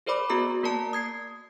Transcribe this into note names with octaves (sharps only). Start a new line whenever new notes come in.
G#4 A#4 C5 D5 B5 D6
B3 F#4 G#4 A#5 D#6
A#3 A#4 D5 A5
D#6 G#6 C7